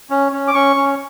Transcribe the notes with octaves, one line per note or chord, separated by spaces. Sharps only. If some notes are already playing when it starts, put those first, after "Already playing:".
C#4
C#4
D6
C#4 C#6
C#4